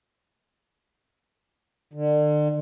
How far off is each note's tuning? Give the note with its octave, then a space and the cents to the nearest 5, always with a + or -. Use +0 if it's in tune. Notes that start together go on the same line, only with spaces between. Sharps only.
D3 +35